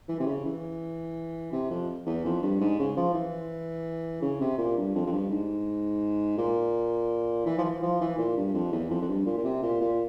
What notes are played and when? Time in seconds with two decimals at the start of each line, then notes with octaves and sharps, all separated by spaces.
0.09 E3
0.20 C3
0.26 C#3
0.45 E3
1.52 C3
1.70 F2
2.06 E2
2.25 F2
2.42 G2
2.61 G#2
2.79 C#3
2.97 F3
3.14 E3
4.22 C#3
4.41 C3
4.58 A#2
4.77 G2
4.95 F2
5.06 F2
5.12 G2
5.31 G#2
6.38 A#2
7.46 E3
7.58 F3
7.64 E3
7.82 F3
8.01 E3
8.18 A#2
8.37 G2
8.54 F2
8.72 E2
8.90 F2
9.02 F2
9.08 G2
9.26 A#2
9.37 A#2
9.44 C3
9.62 A#2
9.81 A#2